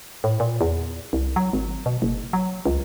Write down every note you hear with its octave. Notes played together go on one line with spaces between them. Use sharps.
A2
A#2
E2
C2
F#3
G#1
B2
F#1
F#3
C#2